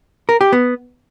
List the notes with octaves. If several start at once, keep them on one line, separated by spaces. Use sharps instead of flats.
A#4
G4
B3